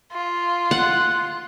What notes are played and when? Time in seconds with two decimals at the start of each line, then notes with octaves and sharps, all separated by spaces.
0.13 F4
0.71 F#5